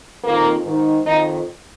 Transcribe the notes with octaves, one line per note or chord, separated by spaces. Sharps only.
F2 D#3 A#3
G#2 D#3
F2 D#3 D#4